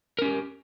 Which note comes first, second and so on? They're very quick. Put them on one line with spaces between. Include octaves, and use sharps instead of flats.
A#4 C#4 G4